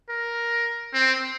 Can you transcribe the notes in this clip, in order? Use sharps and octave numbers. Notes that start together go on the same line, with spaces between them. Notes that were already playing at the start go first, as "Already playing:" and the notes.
A#4
C4